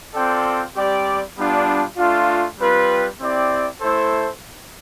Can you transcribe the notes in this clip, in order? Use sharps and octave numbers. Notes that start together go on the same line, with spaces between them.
C4 F4 A4 D5 G5
G3 C4 G4 D5
G3 B3 D4 F4
A3 D4 F4
G3 C4 F4 B4
C4 E4 G4 D5
A3 E4 A4 C5